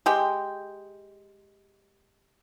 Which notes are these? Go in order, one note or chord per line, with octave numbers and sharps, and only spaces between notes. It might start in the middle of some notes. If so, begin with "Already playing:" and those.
G#3 G4 G5